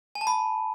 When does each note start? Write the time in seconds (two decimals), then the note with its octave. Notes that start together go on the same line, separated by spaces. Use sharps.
0.15 G#5
0.21 A5
0.27 B5